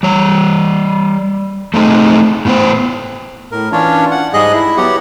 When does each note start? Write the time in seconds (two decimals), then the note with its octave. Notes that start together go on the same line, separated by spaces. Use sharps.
0.03 G3 C#5
1.74 A3 C4 D#4 G#4
2.45 A2 B3 C5
3.52 A2 A#4
3.72 E3 C#4 D4 F4 C#5
4.11 F#5
4.34 G#2 G3 G#4 D#5 F#6
4.53 E4
4.77 F#3 B3 G4 F#5